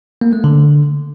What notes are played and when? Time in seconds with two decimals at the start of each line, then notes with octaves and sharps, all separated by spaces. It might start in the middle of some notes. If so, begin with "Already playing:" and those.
0.21 A#3
0.33 A3
0.44 D3